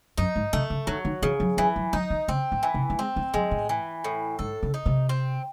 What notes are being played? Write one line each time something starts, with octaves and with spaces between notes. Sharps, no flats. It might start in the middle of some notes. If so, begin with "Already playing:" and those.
F#2 D#4
G#2
C3 A3
C#3
D#3 F#3
D#3
C#3 E3
F#3
E3 F#3
F#3
F#3 D#4
D#3
C#3 C4
A2
E3
C3
A3
G#3 C4
A3
F#3 G#3
A2
E3
A2
G#2 A4
C#3
D#4
C3
C4